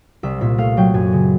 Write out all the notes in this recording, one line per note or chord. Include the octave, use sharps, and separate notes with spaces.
C2 E5
A#2 E5
A3 F5
F#3 G5
F#2 G#5
C#3